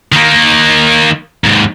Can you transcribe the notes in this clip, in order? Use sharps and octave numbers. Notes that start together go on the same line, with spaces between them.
D#3 A#3
D#2 G#2